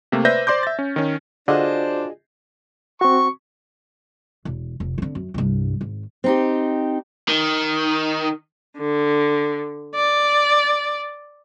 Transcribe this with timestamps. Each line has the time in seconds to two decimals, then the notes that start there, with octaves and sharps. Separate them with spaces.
0.12 C3 A3 A#3
0.25 B4 C5 D5 E5 G6 A#6
0.47 C5 D5 C6 D6 G6
0.63 E5 A6
0.79 C#4
0.96 D#3 C#4
1.48 D3 D4 F4 F#4 G#4 C5 D5 D#5
3.01 C4 F#4 C#6
4.45 E1
4.80 F1
4.98 D3 C4
5.15 F#2
5.34 C2 G2
5.81 G#1
6.24 C4 D#4 G4
7.29 D#3
8.78 D3
9.95 D5